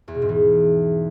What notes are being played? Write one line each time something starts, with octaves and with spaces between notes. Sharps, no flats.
E2
B2
G#2
E3